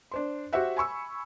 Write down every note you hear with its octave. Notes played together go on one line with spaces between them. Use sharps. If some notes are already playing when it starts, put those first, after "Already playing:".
D4 C5 C6
F#4 G4 C5 E5 F#5
G#5 B5 C#6 E6